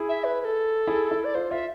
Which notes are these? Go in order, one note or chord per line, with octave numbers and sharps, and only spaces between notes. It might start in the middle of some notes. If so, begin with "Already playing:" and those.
Already playing: E4 G#4
E5
B4
B4
A4
E4 G#4
E4
D5
F4 C5
F4 E5